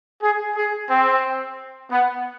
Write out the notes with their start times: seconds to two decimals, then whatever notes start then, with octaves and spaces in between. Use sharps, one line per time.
0.21 G#4
0.55 G#4
0.90 C4
1.90 B3